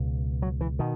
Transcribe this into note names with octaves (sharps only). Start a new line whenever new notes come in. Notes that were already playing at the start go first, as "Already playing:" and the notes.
Already playing: C#2 B2
F#3
E3
B2 D#3